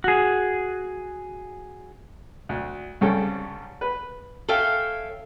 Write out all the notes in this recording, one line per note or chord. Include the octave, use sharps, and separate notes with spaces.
F#4 G#4
D2
C2 G2 C#3 C#4 A4 G5
B4
A4 C#5 E5 F5 G5 G#5